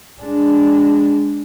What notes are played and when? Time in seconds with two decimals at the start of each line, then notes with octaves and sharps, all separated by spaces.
0.21 G#3 D4